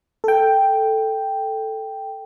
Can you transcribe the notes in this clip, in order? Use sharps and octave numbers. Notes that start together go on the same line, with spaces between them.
A4 G5